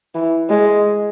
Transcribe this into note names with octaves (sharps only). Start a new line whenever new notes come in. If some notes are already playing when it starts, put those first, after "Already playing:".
E3
G#3